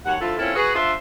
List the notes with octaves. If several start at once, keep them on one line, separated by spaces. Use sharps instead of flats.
D#2 G3 C#5 F#5
D3 F3 E4 F4 A4
A#3 C4 C#4 E4 F4 A4
F#4 G#4 B4
D4 F4 C5 E5